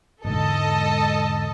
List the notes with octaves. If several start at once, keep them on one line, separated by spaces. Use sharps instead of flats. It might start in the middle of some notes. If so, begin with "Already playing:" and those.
E1 G#2 D3 A4 D#5 A5